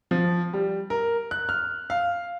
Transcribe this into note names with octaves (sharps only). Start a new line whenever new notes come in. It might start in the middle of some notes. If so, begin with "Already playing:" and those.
F3
G3
A#4
F#6
F6
F5